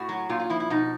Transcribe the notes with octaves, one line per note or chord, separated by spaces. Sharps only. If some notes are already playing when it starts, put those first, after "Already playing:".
Already playing: A2 F#4
F#3
A#2 F4
F4
F3 E4
E4
B2 D#4